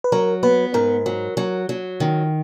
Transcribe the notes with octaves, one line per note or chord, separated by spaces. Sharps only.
B4
F#3 A#4
B3 B4
G#2 A#4
F#3
F#3
F#3
D#3